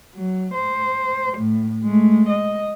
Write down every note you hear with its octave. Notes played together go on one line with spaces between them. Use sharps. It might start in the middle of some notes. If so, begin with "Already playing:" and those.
F#3
C5
A2
G#3 A3
D#5